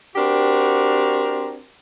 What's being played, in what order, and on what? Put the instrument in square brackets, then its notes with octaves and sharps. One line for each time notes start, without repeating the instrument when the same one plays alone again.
[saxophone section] C4 D4 F#4 G4 A#4